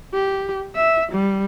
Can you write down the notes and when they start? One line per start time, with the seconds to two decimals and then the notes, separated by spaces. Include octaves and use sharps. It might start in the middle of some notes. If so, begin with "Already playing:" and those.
0.14 G4
0.76 E5
1.12 G3